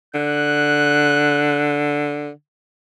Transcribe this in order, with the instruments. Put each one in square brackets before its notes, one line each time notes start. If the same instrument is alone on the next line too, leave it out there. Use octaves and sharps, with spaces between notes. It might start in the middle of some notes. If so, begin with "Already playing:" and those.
[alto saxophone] D3 [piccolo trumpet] F#6